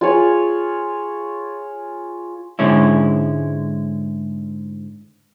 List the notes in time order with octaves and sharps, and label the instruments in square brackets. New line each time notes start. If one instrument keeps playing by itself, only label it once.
[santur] F4 G#4 C#5
[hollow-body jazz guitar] G#2 D3 G#3 C#4 E4